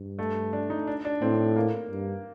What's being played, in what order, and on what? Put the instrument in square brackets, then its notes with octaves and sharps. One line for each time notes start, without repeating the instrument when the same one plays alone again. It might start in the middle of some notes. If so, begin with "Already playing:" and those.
Already playing: [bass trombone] G2
[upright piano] A3
D4
D#4
D4
D4
[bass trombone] A2 [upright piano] C4
[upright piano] A#3
[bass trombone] G2